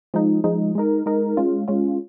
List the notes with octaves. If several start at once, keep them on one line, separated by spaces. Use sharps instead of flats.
F3 G#3 D#4
F3 G#3 D#4
G#3 D#4 A#4
G#3 D#4 A#4
G#3 C#4 F4
G#3 C#4 F4